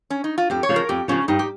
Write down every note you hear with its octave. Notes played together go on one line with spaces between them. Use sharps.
C#4
D#4
F4
F2 G4
C#5
C#3 F3
A#4
F2 G4
C#3 F3 C#4
G2 D#4
G4